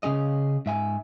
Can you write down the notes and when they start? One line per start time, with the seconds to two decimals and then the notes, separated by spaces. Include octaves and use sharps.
0.03 C#3 C#4 G#4 D#5
0.66 G#2 E5 G#5